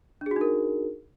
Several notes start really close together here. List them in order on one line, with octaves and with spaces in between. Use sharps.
D4 G#4 F#4 D#4 A#4